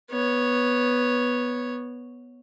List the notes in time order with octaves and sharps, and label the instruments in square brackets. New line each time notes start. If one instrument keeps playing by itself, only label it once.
[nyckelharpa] B3 C#5